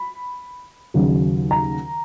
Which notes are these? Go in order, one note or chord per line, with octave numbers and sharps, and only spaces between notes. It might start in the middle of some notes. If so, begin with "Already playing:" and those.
Already playing: B5
D#2 C#3 F#3
A#5